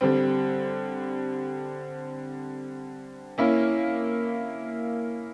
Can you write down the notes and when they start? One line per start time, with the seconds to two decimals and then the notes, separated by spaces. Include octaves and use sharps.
0.01 D3 G3 C4
3.38 A#3 C#4 E4